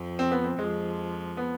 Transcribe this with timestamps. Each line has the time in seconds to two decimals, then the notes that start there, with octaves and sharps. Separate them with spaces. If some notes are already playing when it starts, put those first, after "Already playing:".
Already playing: F2 F3
0.19 C4
0.31 B3
0.44 C4
0.58 F2 F3 G#3
1.37 B3